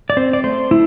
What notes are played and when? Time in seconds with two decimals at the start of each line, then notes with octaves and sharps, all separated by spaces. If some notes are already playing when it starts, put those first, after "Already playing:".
0.10 D5
0.17 C4 C5
0.33 D5
0.44 A3 C5
0.71 A3 E4